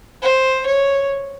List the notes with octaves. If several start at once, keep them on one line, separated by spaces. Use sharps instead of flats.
C5
C#5